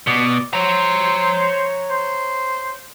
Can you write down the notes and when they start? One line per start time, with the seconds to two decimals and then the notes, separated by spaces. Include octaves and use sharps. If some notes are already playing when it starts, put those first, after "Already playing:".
0.07 B2 D5
0.53 C5 C#5 A#5
1.90 C5